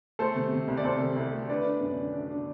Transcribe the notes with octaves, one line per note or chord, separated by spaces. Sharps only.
A3 A4 C5
C3
C3
C2
D5
C2 A4 C5
C3
C2
A3
D4 B4 D5
D4
F#2
D3
D4
D4